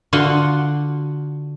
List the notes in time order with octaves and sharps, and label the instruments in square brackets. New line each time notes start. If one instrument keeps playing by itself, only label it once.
[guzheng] D3 F4 F#4 F#5 C6